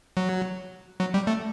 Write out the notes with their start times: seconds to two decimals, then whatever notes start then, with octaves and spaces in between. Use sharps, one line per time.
0.17 F#3
1.00 F#3
1.14 G3
1.27 A3